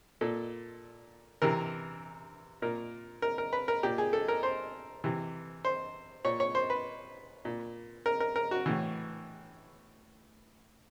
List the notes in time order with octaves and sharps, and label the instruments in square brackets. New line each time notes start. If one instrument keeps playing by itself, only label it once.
[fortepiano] A#2 A4
C3 E3 A#4
A#2 A#4
A#4
A#4
B4
A#4
A#2 G4
G#4
A4
A#4
C5
C3 E3
C5
A#2 C#5
C#5
C5
B4
A#2
A#4
A#4
A#4
F#4
A2 E3